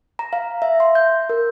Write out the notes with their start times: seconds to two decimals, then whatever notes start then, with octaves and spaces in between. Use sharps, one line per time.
0.19 A#5
0.33 F5
0.62 E5
0.80 C6
0.95 G6
1.30 A#4